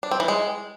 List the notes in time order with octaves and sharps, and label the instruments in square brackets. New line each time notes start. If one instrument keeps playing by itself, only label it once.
[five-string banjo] D4
C4
E3
G#3